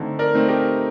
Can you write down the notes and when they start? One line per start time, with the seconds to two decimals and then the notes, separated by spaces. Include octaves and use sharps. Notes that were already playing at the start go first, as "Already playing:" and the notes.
Already playing: D3 A3 C4 D#4
0.19 A#4 D5
0.34 A3 C4 D#4
0.48 G4 A#4